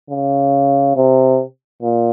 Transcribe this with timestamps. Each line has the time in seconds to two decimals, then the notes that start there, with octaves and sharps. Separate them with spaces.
0.10 C#3
0.97 C3
1.83 A#2